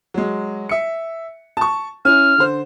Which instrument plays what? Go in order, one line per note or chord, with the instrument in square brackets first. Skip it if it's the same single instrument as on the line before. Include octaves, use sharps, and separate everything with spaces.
[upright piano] F#3 G#3
E5 C#7
A5 C#6
[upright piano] C#4 E4 [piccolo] F6
[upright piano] D3 C5